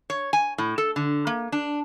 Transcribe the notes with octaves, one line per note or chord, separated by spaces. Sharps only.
C#5
G#5
A2
A4
D3
A#3
D4